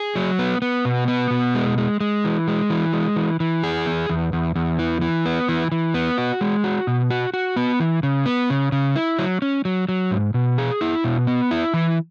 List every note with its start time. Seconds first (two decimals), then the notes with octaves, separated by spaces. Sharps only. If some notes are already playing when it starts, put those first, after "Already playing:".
Already playing: G#4
0.16 F#3
0.39 B3
0.62 B3
0.85 B2
1.08 B3
1.31 B2
1.55 G#3
1.78 G#3
2.01 G#3
2.24 E3
2.48 G#3
2.70 E3
2.93 G#3
3.16 E3
3.40 E3
3.63 G#4
3.86 E2
4.09 E2
4.33 E2
4.56 E2
4.79 E3
5.02 E3
5.26 B3
5.49 E3
5.72 E3
5.94 B3
6.18 F#4
6.41 G#3
6.64 F#4
6.87 B2
7.11 F#4
7.34 F#4
7.56 B3
7.80 E3
8.03 C#3
8.26 B3
8.50 C#3
8.72 C#3
8.96 E4
9.19 F#3
9.42 C#4
9.65 F#3
9.89 F#3
10.11 G#2
10.34 B2
10.58 G#4
10.81 E4
11.04 B2
11.27 B3
11.51 E4
11.74 E3